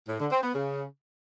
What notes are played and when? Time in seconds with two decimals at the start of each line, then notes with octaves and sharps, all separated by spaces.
0.09 A2
0.20 D3
0.32 C4
0.43 B3
0.55 C#3